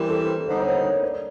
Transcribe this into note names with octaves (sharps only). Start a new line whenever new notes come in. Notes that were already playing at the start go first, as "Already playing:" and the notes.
Already playing: E3 G3 C4 A#4
A4
A4
D3 G3 B3 D#4 C5
C#5
C5
C#5
D5